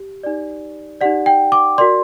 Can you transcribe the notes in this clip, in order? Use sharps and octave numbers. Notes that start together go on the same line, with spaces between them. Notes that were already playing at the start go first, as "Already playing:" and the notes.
Already playing: G4
D#4 G4 D5
D#4 G4 D5 F#5
G5
D6
F#4 A#4 D5 C6